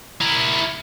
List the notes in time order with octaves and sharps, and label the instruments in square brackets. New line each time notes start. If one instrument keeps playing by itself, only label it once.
[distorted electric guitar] E4 A#4